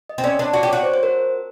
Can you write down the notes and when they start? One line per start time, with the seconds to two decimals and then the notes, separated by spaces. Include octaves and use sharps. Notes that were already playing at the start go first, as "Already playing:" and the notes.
0.09 D#5
0.18 C4
0.24 C#4 D5
0.39 D4
0.53 F#4 D5
0.63 G4
0.69 F#4 C#5
0.83 C5
0.94 C5
1.03 A#4